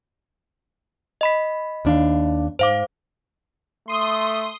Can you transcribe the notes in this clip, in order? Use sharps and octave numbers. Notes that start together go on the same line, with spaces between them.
D#5 B5 B6
D#2 D4 F5
G#2 C5 F5 D6
A3 C6 D#6